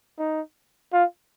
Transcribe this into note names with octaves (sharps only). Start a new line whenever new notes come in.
D#4
F4